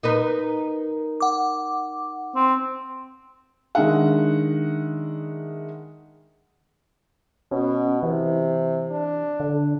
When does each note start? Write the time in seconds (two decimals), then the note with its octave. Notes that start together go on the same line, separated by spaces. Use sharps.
0.03 D#4 A#4 B4
1.20 F#5 D6
2.35 C4
3.75 D#3 G#3 D4 E5 F#5
7.52 B2 C#4
8.03 C3 E3
8.91 D4
9.40 D3